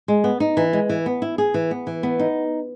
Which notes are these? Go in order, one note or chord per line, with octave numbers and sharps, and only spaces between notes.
G#3
B3
D#4
E3
G#3
E3
B3
E4
G#4
E3
B3
E3
B3
D#4